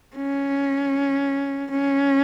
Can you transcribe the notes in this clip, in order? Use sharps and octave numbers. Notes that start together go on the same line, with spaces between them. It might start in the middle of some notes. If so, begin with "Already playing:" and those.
C#4
C#4